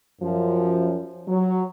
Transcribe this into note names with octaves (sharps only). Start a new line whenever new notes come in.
F#2 F3
F#3